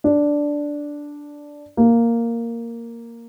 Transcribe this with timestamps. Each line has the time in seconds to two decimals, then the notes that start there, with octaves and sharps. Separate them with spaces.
0.04 D4
1.77 A#3